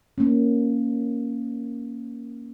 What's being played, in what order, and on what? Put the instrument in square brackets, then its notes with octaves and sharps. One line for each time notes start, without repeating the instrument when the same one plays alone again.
[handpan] A#3 C#4